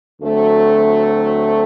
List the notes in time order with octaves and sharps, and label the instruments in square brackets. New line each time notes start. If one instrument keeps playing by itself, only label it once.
[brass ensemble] D2 D3 F#3 A3 C4